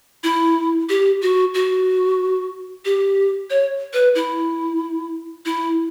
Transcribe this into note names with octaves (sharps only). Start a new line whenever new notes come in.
E4
G4
F#4
F#4
G4
C#5
B4
E4
E4